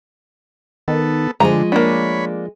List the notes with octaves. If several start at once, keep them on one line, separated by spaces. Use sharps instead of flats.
D#3 B3 A4
D3 F3 G#3 A3 G#4 A#5
A#3 D4 C#5 B5